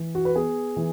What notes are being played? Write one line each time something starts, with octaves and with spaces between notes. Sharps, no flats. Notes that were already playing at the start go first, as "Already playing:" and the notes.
Already playing: E3
F#4
B4
B3 G#4
E3